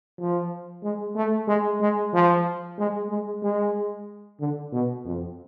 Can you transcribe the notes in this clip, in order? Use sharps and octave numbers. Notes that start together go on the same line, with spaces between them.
F3
G#3
A3
G#3
G#3
F3
G#3
G#3
G#3
D3
B2
F2